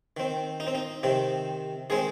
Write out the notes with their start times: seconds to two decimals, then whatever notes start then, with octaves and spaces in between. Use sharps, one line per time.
0.17 D#3 C4
0.60 D#4
0.67 C4
0.75 D#4
1.03 C3 D#3 C4
1.90 D#3 G#3 C4 G#4